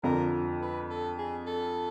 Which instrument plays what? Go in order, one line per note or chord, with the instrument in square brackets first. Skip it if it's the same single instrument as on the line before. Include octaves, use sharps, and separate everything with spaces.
[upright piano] F2 D3 F3 [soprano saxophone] A#4
[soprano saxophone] B4
A4
G#4
A4